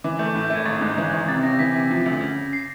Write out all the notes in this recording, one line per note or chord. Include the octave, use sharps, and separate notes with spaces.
E3 D6
A3 G6
A2 G6
G6
A3
G#6
G#1 A6
G#2
E3
G#1
C3 A6
C3 A#6
E3 B6
C3
F3
D2
C#3
C#3
C7